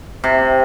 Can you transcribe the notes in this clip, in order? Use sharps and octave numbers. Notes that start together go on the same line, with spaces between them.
C3